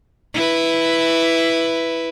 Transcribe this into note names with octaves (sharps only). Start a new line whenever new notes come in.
E4 B4